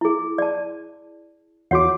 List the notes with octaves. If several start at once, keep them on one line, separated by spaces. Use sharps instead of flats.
E4 G#4
D5 A5
E2 F#4 C#5 F#5 D6